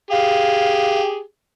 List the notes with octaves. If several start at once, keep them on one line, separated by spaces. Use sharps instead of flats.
G4 G#4 F5